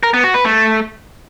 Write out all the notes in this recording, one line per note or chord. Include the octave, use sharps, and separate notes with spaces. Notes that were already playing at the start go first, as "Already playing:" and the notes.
A#4
B3
F#4
B4
A3